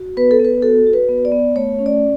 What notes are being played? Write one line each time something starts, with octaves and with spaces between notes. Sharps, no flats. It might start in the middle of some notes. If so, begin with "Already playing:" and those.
Already playing: F#4
B3 B4
A4
B3 B4
F#4 A4
F#4
B4
B3
D5
B3
A3 C#5
C#4
D5